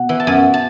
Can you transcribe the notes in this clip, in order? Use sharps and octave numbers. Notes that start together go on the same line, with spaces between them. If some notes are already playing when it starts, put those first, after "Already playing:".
Already playing: B2 F#5
E3
A5
F#2 G#5
A5